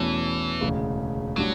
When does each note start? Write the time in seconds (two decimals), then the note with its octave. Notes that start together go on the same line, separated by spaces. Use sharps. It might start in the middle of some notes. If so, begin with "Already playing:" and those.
Already playing: E2 B2 E3 A3 C#4
0.61 E1 D2 C#3
1.36 A2 F#3 G3 D4 F#4